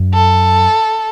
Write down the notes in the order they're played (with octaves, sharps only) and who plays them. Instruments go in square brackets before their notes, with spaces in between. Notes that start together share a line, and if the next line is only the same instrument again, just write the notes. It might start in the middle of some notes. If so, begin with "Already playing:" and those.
Already playing: [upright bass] F#2
[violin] A4